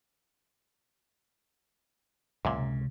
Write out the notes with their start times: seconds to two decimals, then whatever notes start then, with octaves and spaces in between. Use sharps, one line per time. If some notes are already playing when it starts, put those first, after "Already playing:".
2.45 C#2 F#2 A#2 C#3
2.57 C3